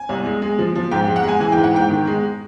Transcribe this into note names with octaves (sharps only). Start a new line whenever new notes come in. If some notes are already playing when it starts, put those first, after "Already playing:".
Already playing: G#5
C2
G#3
G#3
F3
F3
G#2 G5
G#3 G5
F#5
G#3 G#5
E3 G#5
G#2 G5
F#5
G#2 G5
D#3
G#3